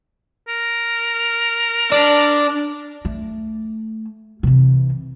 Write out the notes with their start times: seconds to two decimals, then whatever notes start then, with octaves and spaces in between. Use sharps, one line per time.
0.48 A#4
1.92 D4
3.05 A3
4.43 C3 E3